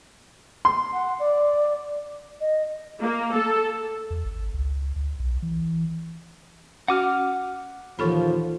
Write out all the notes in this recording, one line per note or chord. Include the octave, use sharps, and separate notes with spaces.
C6
F#5
D5
D#5
A#3
A4
E2
G#1
C#2
D2
B1
E3
C#4 F#4 F#5 D6 F6
D#2 A#2 E3 F3 A4 B5